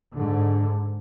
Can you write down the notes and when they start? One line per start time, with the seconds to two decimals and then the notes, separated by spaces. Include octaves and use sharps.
0.14 G#2 D3